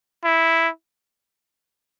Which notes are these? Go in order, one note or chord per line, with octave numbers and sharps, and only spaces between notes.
E4